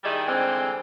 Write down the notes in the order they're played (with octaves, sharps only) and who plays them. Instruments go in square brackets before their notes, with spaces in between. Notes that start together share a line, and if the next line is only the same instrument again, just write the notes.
[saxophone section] D#3 G3 D#4 E4 G#4 D5
D3 E3 G3 G#3 C4